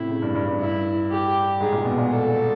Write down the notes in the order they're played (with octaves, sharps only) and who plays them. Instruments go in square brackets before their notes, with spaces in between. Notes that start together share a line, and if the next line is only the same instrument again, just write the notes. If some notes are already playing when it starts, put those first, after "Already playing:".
Already playing: [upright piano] A2 C3 [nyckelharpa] E4
[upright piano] C#3
G2
G2
G2
[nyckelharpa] E4
G4
[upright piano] G#2 [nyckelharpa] G#4
[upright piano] A#2
B2
A#2
[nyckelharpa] A4